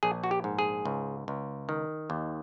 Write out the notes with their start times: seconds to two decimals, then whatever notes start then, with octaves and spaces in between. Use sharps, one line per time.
0.03 A#1 G#4
0.24 F#4
0.31 G4
0.44 G#2
0.59 G#4
0.85 C#2
1.28 C#2
1.69 D#3
2.10 D#2